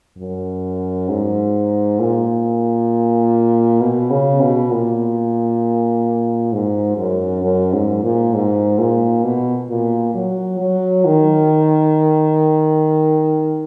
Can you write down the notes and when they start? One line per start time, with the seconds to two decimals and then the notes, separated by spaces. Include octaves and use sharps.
0.18 F#2
1.09 G#2
1.99 A#2
3.81 B2
4.11 C#3
4.41 B2
4.71 A#2
6.52 G#2
6.97 F#2
7.43 F#2
7.73 G#2
8.03 A#2
8.34 G#2
8.79 A#2
9.23 B2
9.69 A#2
10.14 F#3
10.60 F#3
11.05 D#3